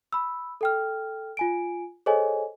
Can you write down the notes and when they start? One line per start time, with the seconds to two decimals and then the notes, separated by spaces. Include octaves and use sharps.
0.13 B5 E6
0.61 A4 G5 F6
1.37 F4 G#5 D7
2.06 G#4 A4 C5 C#5 D#5 G#5